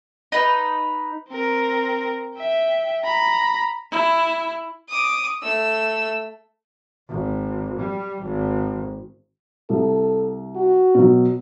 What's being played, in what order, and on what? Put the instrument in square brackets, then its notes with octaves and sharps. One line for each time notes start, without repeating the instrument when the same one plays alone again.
[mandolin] D#4 B4
[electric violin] C4 A#4
E5 G5
A#5 B5
[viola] E4
[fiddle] D6 D#6
A3 E6
[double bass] G#1
G3
G#1
[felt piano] C2 [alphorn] A4
[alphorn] F#4
[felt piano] B2 F#3